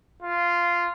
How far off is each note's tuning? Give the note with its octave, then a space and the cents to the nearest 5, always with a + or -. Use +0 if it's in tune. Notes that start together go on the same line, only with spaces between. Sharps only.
F4 -10